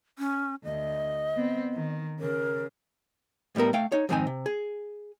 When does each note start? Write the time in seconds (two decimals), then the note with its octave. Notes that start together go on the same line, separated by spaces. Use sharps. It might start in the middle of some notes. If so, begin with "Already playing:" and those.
0.19 C#4
0.64 D2 D#5
1.36 B3 C4
1.74 D#3
2.20 C#3 A#4
3.56 A2 G3 B3 A#4
3.73 A3 F5 G5
3.92 D#4 C#5
4.09 F2 G#2 D#3 C4 D#4 G#5
4.27 C3
4.46 G#4